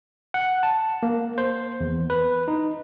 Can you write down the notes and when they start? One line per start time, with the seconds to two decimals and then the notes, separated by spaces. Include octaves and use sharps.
0.34 F#5
0.63 A5
1.03 A#3
1.38 C5
1.81 E2
2.10 B4
2.48 D#4